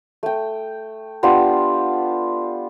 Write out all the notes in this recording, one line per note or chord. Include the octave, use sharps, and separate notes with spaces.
A3 G5
B3 D4 F4 G4